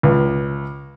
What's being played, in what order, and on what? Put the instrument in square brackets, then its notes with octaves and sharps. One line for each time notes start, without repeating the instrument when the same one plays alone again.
[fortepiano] C#2